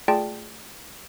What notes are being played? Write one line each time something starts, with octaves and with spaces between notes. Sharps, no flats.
A3 F4 G#4 D5 G5 A5